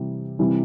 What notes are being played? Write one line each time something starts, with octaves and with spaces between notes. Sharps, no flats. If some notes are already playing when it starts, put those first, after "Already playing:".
Already playing: C3 E3 G3
C3 E3 G3